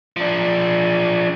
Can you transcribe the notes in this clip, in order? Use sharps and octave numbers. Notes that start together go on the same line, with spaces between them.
F3 D4